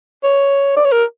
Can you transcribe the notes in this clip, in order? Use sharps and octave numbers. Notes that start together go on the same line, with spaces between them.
C#5
D5
C#5
A#4